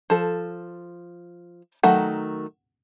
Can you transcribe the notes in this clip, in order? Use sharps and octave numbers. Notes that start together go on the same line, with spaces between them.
F3 A4
D#3 F#3 A3 F#5